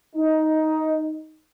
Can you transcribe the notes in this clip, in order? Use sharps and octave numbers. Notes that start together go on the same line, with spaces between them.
D#4